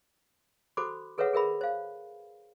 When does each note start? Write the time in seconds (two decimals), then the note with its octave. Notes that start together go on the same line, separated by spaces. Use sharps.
0.77 F#4 A4 C5 B5 D6
1.18 G#4 A4 B4 C#5 E5 F#5
1.33 G#4 A#4 E5 B5
1.61 C5 F5